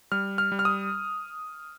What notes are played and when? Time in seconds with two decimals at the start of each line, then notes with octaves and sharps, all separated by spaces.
0.12 G3 F6
0.38 F6
0.52 G3
0.59 F6
0.65 D#6